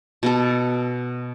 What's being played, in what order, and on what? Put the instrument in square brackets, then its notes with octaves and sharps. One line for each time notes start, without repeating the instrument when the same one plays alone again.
[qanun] B2 B3 A4